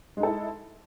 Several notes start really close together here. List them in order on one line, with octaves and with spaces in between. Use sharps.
G#3 D#4 A4 E4